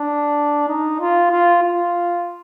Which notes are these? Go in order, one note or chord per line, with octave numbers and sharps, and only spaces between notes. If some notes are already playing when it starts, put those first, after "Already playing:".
Already playing: D4
D#4
F4
F4
F4